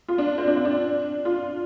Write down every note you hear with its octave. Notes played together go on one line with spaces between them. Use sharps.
F4
D4
C4
D4
C4
D4
F4